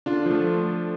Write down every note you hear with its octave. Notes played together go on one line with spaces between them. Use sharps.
D3 D4 F4
F3 A3